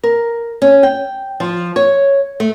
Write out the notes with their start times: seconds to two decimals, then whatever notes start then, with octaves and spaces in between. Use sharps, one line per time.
0.03 A#4
0.62 C#4
0.83 G5
1.40 F3
1.76 C#5
2.40 A3